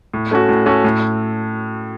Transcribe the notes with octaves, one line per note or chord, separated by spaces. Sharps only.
A2
A3 C#4 F#4
A2
A3 C#4 F#4
A2